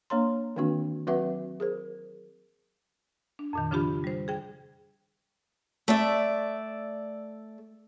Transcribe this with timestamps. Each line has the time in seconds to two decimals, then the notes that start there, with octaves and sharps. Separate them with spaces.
0.10 A#3 D4 C#5 A#5 C6
0.56 D#3 E3 A#3 C4 D4 F#4
1.07 F#3 C4 F#4 B4 E5 F#5
1.60 G#4 A#4 C5
3.39 D4
3.53 F2 A#2 D#3
3.71 C#3 F3 D4 F4 G4 B5
4.04 G3 C5
4.28 G#4 G5
5.88 A3 D5 E5